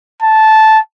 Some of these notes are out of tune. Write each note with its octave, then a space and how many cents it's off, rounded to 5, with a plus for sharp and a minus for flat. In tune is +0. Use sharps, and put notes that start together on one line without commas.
A5 -10